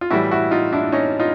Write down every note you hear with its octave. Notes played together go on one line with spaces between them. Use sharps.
F4
A2 E3 G3 E4 F#4
E4 F#4
D#4 F4
D4 E4
C#4 D#4
D#4 F4